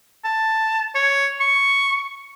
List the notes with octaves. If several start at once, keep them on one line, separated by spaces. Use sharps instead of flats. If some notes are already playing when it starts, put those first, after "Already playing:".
A5
C#5
C#6